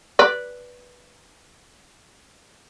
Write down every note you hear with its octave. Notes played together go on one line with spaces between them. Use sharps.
B4 D5